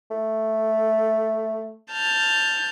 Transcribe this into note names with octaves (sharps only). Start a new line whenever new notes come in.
A3
A5 F6 G6